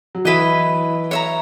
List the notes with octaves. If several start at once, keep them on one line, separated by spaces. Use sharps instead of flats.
F#3
E3 E4 B4 D#5
C#5 E5 A#5